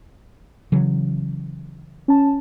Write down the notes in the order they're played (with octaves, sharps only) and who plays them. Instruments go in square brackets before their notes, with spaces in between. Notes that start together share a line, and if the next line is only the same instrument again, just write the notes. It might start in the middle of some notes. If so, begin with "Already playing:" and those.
[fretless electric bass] C#3 E3 F#3
[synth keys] C#4 A5